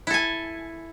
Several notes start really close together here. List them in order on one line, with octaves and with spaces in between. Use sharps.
E4 A4 G#5